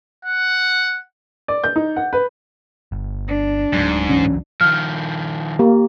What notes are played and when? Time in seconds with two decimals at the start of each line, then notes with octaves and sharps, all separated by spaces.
0.25 F#5
1.48 D5
1.64 G6
1.76 D#4
1.96 F#5
2.13 B4
2.92 G1
3.28 D4
3.73 D1 G#2 F#3
4.09 C#2 E3 F#3 C#4
4.61 D#3 F3 F6
5.59 A#3 G4